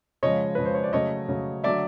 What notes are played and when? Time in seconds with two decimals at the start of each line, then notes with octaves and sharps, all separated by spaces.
0.23 C#3 F3 G#3 C#5 D#5
0.55 C#3 F3 G#3 B4
0.65 C5
0.75 C#5
0.84 D5
0.93 C#3 F#3 A3 C#5 D#5
1.28 C#3 F#3 A3
1.64 D3 F#3 A3 D5 E5